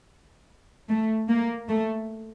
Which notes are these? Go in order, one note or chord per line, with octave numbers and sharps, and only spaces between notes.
A3
A#3
A3